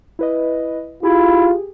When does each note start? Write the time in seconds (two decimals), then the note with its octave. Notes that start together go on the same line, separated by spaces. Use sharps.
0.19 E4 B4 D#5
1.03 E4 F4 G4 G#4